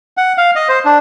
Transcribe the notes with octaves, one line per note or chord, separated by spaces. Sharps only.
F#5
F5
D#5
C5
D4